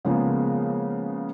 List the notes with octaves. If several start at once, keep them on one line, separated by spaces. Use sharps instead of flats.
C#3 F3 G#3 A#3 B3